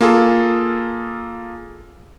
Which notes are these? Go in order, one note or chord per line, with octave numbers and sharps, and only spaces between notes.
A#3 F4 G#4 A4